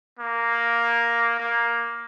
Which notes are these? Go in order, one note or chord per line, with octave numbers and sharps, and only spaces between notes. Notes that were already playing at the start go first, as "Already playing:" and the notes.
A#3
A#3